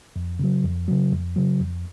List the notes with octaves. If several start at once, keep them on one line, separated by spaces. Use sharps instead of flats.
F2
C#3 F#3
F2
C#3 F#3
F2
C#3 F#3
F2